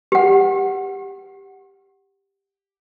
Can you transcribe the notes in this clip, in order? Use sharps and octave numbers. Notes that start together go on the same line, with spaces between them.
G4 F#5